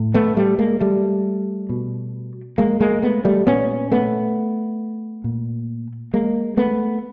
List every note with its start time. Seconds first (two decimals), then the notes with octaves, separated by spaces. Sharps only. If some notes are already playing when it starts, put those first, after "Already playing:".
Already playing: A2
0.14 A3 B3
0.37 G3 A3
0.59 G#3 A#3
0.80 G3 A3
1.69 B2
2.58 G#3 A#3
2.81 G#3 A#3
3.02 A3 B3
3.25 G3 A3
3.47 A#2 B3 C#4
3.92 A3 B3
5.24 A#2
6.14 G#3 A#3
6.57 A3 B3